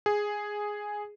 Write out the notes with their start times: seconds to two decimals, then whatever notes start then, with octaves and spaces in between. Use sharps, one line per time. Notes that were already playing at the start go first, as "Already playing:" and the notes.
0.06 G#4